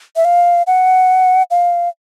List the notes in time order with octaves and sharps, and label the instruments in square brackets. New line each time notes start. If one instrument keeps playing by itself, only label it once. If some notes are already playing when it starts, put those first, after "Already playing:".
[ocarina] E5
F5
F#5
F5